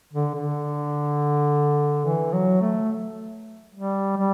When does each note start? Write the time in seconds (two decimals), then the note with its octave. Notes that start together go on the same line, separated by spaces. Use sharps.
0.13 D3
0.34 D3
2.05 E3
2.33 F#3
2.61 A3
3.74 G3
4.17 G3